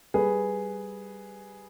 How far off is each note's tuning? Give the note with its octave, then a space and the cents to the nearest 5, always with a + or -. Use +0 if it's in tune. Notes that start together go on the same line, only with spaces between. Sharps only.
G3 +0 G#4 +0 B4 +0